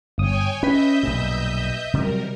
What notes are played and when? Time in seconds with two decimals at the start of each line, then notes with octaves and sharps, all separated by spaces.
0.18 G1 C#5 G5 G#5 D#6
0.63 C#4 B4 D#5 E5 G6 B6
1.03 B1 G2 A#2
1.94 C3 D#3 F#3 G3 A#4